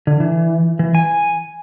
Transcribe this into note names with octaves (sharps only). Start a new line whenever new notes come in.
D3
E3
E3
G#5